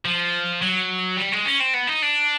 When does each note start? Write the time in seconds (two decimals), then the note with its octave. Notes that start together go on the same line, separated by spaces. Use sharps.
0.05 F3
0.62 F#3
1.17 G3
1.32 G#3
1.46 C#4
1.60 C4
1.74 B3
1.87 D#4
2.03 D4